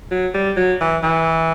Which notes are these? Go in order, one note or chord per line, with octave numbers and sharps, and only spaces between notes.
F#3
G3
F#3
E3
E3